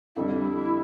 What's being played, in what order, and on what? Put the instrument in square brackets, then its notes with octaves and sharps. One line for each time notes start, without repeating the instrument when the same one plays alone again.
[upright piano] F2 D3 G3 [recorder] E4